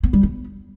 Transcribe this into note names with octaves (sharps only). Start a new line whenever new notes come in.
B3
G3
B3